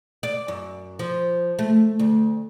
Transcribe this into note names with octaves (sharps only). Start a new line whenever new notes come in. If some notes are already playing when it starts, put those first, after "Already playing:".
D5
F#2
F3
A3
D2